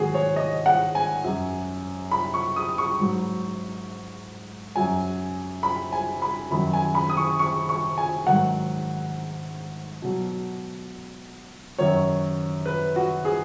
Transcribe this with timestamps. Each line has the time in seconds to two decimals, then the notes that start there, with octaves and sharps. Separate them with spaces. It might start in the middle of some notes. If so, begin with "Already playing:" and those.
Already playing: G#2 D#3 F#3 F#4 G#4
0.14 C#5
0.36 D#5
0.66 F#5
0.95 G#5
1.24 F#2 F#3
2.11 B5
2.34 C#6
2.56 D#6
2.78 C#6
3.00 G#2 F#3
4.76 F#2 F#3 G#5
5.63 B5
5.92 G#5
6.22 B5
6.51 F#2 D#3 F#3 B5
6.73 G#5
6.95 B5
7.10 D#6
7.17 C#6
7.39 C#6
7.69 C#6
7.98 G#5
8.27 G#2 D#3 F#3 F#5
10.02 B2 F#3
11.79 F#2 D#3 F#3 C#5
12.66 B4
12.96 F#4
13.25 G#4